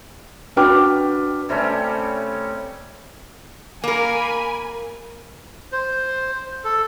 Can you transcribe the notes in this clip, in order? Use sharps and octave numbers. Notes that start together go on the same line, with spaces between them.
D4 F#4 B4 G5 D6 F6
C3 G3 A3 C#4
A#3 A#4 G#5 B5
C5
A4